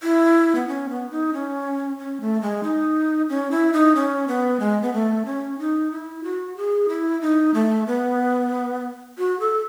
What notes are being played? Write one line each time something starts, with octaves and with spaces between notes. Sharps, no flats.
E4
B3
C#4
B3
D#4
C#4
C#4
A3
G#3
D#4
C#4
E4
D#4
C#4
B3
G#3
B3
A3
C#4
D#4
E4
F#4
G#4
E4
D#4
A3
B3
F#4
A4